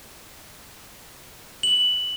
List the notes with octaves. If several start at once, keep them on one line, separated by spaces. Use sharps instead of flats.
F#7